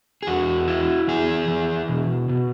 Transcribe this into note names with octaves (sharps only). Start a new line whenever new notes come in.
G#4
E2 F#4
E4
E3 G#4
E3
B2
B2